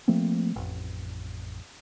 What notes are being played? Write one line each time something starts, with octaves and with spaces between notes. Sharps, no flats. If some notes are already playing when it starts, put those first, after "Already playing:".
F3 A3 A#3 C4
A1 F2